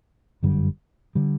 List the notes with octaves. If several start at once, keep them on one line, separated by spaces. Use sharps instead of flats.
G1 F#2 D3 G3
D3 G3